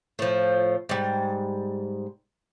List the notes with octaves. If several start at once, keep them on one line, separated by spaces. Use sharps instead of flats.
A2 F3
G#2 G3